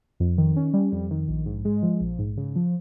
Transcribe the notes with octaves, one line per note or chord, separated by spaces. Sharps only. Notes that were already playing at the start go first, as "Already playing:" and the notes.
F2
D#3
C#4
G3
F2
D#3
A#1
G#2
G#3
F3
A#1
G#2
C#3
F3